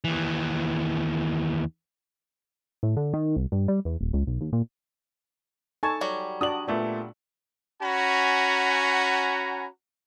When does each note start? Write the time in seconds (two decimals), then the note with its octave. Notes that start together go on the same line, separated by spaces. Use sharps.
0.04 D#2 E3
2.83 A2
2.97 D3
3.13 D#3
3.36 C2
3.52 G2
3.68 G3
3.85 E2
4.01 D#1
4.13 C#2
4.27 B1
4.41 D#2
4.52 A#2
5.83 D#4 A4 G#5 A5 C#6 G#6
6.01 F#3 G3
6.41 D4 F#4 D5 D#6 F#7
6.68 A#2 A3 B3 D5
7.82 C#4 F#4 F#5 G#5 A#5 B5